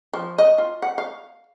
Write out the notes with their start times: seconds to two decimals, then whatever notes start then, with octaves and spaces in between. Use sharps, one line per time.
0.13 F3
0.38 D#5
0.58 F4
0.82 F#5
0.98 F5